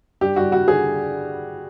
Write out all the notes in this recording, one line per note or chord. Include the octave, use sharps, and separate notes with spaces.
G2 G4
G2 F#4
G3 F#4
D3 G#4